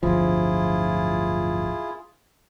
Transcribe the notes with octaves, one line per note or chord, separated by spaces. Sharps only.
D1 G1 F3 E4 F4 G#4